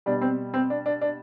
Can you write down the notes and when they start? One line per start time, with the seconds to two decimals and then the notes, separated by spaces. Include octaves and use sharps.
0.06 B2 G3 D4
0.21 C4
0.54 C4
0.70 D4
0.86 D4
1.01 D4